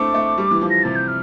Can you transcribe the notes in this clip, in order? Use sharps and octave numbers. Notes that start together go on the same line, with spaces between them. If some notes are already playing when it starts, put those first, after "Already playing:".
Already playing: A3 C4 D4 E4 D6
A3
G3
E3
F3
A#6
C3 A6
G6
F6